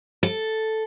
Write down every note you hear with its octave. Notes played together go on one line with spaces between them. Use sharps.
A4